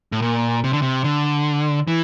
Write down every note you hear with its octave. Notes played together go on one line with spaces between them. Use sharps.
A2
A#2
C3
D3
C3
D3
E3